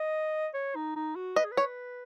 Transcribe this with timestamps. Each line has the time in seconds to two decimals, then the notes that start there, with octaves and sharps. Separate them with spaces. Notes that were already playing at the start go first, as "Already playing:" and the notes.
Already playing: D#5
0.54 C#5
0.76 D#4
0.96 D#4
1.16 F#4
1.36 B4 D#5
1.44 G#4
1.52 B4
1.57 C#5